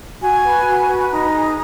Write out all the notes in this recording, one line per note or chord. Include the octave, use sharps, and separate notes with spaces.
F#4 G#5
B4
F#4
B4
D#4 A#5
G#4